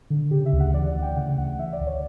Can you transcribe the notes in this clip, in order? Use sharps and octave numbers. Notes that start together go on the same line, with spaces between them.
D3
C#3 G4
E5
D2
F#5
E3 D5
F#5
D2
G5
C#3 F#5
D2 F#5
E3 E5
D5
D2
C#5